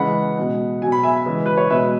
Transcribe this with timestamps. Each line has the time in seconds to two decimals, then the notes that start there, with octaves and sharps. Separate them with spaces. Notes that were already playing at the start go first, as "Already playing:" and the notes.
Already playing: C#3 E3 G#3 F#5 B5
0.37 B2 G#3
0.82 B2 F#3 G#5
0.92 B5
1.03 E5 G#5
1.26 C#3 E3 G#3
1.46 B4
1.57 C#5
1.70 B2 G#3 B4 E5